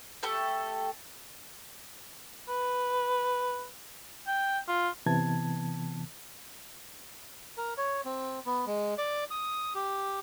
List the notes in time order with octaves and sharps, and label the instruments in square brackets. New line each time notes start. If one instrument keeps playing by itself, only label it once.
[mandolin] A3 G4 A4 G5
[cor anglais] B4
G5
F4
[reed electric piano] C3 E3 B3 A5 G#6
[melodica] A#4
C#5
C4
B3
G#3
D5
D#6
G4